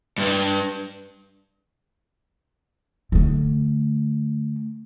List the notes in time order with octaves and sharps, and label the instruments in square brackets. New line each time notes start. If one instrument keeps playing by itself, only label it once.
[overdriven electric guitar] G2 G3
[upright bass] D3 A3